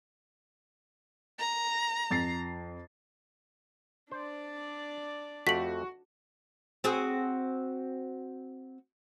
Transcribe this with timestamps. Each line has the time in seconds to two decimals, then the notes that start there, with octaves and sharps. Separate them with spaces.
1.39 A#5
2.11 F2 A6 C7
4.11 D4 C5 D5
5.47 F2 A3 F#4 G4 B6 F#7
6.84 C4 F#4 G#4